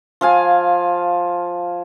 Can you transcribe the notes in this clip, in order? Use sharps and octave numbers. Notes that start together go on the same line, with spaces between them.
F3 F5 G#5